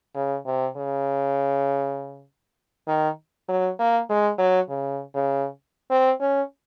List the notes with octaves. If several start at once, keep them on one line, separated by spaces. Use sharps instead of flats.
C#3
C3
C#3
D#3
F#3
A#3
G#3
F#3
C#3
C#3
C4
C#4